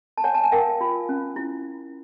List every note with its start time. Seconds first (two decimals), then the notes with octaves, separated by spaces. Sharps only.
0.18 A5
0.24 C#5 F#5 G#5
0.34 A5
0.44 G#5
0.52 A#4 F5 G5
0.81 F4
1.09 C#4
1.36 E4